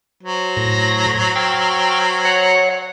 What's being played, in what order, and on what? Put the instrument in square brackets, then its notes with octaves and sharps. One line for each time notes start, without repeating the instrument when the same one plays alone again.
[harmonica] F#3 C5
[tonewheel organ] A2 A#6
G5 E6 F6
C#5 F#5